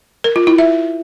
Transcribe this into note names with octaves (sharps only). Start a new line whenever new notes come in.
A#4
F4
E4
E5